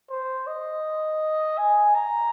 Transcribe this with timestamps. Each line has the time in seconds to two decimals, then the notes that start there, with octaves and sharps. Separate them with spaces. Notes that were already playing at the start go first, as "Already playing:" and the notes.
0.10 C5
0.47 D#5
1.58 G#5
1.95 A#5